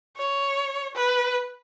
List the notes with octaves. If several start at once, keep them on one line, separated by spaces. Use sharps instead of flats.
C#5
B4